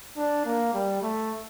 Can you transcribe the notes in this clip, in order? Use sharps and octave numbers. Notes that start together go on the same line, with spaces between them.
D4
A#3
G3
A3